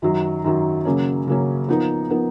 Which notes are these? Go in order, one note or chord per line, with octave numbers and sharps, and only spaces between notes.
F#2 D#3 F#3
F#2 D#3 F#3
C#3 F#3 A#3 C#4
C#3 F#3 A#3 C#4
F3 B3 D#4 A#4
F3 B3 D#4 A#4